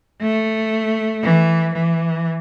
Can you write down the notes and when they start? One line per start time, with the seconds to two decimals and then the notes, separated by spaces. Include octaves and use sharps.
0.21 A3
1.23 E3
1.74 E3